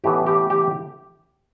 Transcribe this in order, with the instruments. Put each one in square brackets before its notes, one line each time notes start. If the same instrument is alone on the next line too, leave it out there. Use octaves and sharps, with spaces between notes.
[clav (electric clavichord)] A1 A2 E3 B3 G4
G4
G4